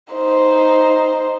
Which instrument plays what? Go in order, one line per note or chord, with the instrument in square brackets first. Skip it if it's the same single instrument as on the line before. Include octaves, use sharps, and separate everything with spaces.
[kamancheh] D#4 C5